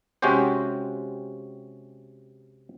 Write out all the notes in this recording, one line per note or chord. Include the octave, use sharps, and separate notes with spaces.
C3 G#3 C#4 F#4 G4 C5